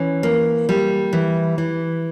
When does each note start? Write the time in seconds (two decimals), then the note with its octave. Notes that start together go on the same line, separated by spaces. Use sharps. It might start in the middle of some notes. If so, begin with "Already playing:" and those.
Already playing: E3 C#4
0.23 A#3
0.69 G3
1.13 E3
1.58 E3